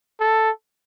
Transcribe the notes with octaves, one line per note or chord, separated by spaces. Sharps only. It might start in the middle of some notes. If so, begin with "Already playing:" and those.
A4